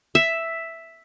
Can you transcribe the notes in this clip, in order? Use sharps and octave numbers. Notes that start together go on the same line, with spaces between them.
E5